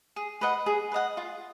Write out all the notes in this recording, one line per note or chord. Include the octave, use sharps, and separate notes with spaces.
G#4
B4 D#5 F#5
G#4
B4
D#5 F#5
F4